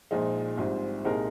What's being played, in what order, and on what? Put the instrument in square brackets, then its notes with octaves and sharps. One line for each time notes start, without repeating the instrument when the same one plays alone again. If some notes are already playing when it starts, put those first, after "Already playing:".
[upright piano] A#1 A#2 F3 G#3 D#4
A#1 G#2 G3 C4
C2 A#2 G#3 D#4 A#4